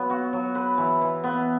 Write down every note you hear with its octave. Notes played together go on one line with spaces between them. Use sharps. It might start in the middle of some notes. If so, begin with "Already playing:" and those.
Already playing: F#3 B3 B4
F#4
F#3
B4
E3
E3
B3